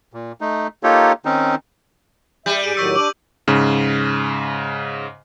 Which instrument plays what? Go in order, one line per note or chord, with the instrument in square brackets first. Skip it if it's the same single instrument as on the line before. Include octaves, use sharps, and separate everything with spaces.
[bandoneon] A#2
A3 D#4
A#3 D#4 F4 G4 A4 C#5
D#3 C4 C#4 D#4
[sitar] G3 [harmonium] E5 [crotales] G6 D#7
[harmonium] G#2 G#4 [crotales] D7
[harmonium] A2 D#3 F#3 [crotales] C#6 E6
[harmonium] D4 [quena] D6 [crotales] F#7
[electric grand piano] G#2 C#3